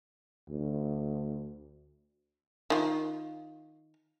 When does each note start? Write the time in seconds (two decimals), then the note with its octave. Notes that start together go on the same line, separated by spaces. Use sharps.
0.49 D2
2.70 D#3 F4